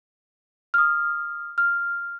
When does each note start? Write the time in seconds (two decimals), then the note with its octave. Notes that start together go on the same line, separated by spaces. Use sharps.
0.74 D#6 F6
1.58 F6